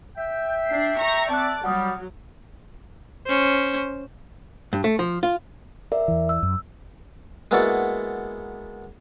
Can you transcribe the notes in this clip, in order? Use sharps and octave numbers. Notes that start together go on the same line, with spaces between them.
E5 G5
D4 C7
A#5 C#6
C4 D5 E5 A5 F#6
F#3 G3 F#5 D#6 F6
C#4 C5
G2
A3
F3
F4
A#4 D5 E5
E2 E3
E6
F#2
G#3 A#3 B3 E4 F#4 D5